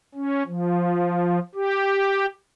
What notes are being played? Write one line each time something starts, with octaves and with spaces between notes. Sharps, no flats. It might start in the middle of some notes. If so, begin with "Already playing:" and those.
C#4
F3
G4